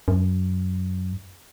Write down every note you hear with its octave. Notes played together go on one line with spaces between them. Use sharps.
F#2